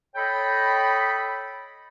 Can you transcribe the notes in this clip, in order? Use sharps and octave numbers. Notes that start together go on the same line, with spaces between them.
A4 C#5 D#5 G5 B5